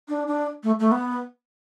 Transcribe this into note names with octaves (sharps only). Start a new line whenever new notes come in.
D4
D4
A3
A3
B3